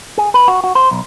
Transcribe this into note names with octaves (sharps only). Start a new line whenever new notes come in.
G#4
B4
F#4
F#4
C5
B1